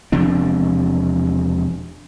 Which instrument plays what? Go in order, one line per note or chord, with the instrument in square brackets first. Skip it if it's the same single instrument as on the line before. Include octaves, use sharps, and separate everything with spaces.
[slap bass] E1 C3 F3 D4